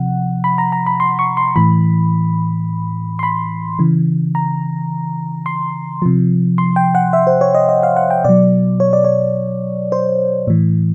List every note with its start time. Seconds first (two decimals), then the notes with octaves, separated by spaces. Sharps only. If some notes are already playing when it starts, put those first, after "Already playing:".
Already playing: C3 F3 F#5
0.44 B5
0.58 A#5
0.72 A#5
0.86 B5
1.00 C6
1.19 C#6
1.37 C6
1.56 A2 E3 B5
3.19 C6
3.23 B5
3.79 C#3 E3
4.35 A#5
5.46 C6
6.02 C3 F3
6.58 C6
6.76 G5
6.95 F#5
7.13 E5
7.27 C5
7.41 C#5
7.55 D#5
7.69 D#5
7.83 F5
7.97 F#5
8.10 G5
8.24 B2 F#3 D5
8.80 C#5
8.93 D5
9.04 C#5
9.92 C5
10.47 A2 E3